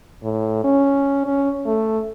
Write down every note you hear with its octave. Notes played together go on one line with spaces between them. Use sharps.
A2
C#4
C#4
A3